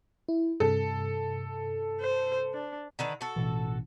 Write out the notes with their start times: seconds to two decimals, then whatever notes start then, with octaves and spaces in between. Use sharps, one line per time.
0.29 E4
0.60 G2 C3 A4
2.01 C5
2.54 D4
2.99 D3 D#3 B4
3.21 F#4 A4
3.36 A1 B2 E3